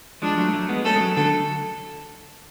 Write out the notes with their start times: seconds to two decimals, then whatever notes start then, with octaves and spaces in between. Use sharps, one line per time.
0.22 F3 G#3 D4
0.38 F#3 A3
0.53 F#3 A3
0.69 G#3 B3
0.85 A3 C#4 A4
0.96 G#3
1.01 F#3 A3
1.16 D3 F#3 A4